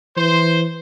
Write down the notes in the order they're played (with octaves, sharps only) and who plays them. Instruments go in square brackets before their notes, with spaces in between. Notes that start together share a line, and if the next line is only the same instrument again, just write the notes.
[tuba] E3 [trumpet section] C5